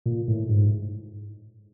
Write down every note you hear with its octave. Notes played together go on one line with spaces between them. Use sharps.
A#2
A2
G#2